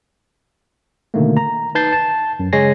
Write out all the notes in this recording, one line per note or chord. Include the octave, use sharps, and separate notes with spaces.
B2 D3 D#3 A3 A#3
A#5
D#4 B4 A5 G6 A6 C7
A5
F#2
C#3 G#3 C#5 G#5 A#6 C7